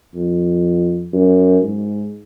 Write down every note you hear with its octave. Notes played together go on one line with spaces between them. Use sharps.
F2
F#2
G#2